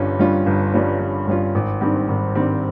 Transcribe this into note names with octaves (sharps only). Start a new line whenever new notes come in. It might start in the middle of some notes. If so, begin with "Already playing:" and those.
Already playing: G1 G2 G3 C#4 F4
G2 G3 C#4 F4
G1
G2 G3 C#4 F4
G1
G2 G3 C#4 F4
G#1
G2 D#3 G3 C4
G#1
G2 D#3 G3 C4